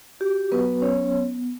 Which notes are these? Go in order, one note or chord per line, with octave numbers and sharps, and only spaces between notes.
F#4 G4
F#3 B3 B4
B3 C#4 C#5